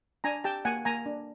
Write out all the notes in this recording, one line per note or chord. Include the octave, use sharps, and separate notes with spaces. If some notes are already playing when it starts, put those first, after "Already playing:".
D4 G#5 A#5
G4 G5 A5
A#3 F#5 G#5
A#3 G#5 A#5
D4